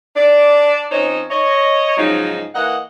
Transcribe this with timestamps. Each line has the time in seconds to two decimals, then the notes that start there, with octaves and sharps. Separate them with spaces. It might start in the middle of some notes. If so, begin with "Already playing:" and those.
0.16 D4 D5
0.92 F2 C#4 D#4 C5 C#5 D#5
1.31 C#5 D#5
1.97 G#2 C#3 F3 F#3 D#4
2.55 E3 A#3 D#5 F#5